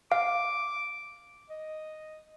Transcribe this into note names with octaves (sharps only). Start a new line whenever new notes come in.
F5 D6
D#5